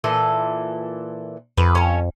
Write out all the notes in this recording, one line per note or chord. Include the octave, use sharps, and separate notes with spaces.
A#2 E3 A4
F2 B4
C#4 A4 C#5